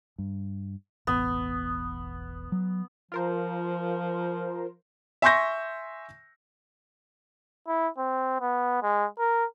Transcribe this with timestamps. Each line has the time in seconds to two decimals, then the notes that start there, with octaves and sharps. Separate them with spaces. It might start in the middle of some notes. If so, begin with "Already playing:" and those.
0.18 G2
1.07 E1 A1 B3
2.52 F#3
3.12 F3 F4 A#4 C5
5.22 E5 G#5 C6 C#6 G6 A#6
7.67 E4
7.98 C4
8.41 B3
8.82 G#3
9.19 A#4